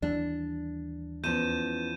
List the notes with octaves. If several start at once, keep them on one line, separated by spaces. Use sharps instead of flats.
D#2 E3 G3 D4
E2 F3 B3 C#4 B4 G6 D#7 E7